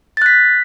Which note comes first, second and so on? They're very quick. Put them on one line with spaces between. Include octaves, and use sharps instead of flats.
A6 F#6 B6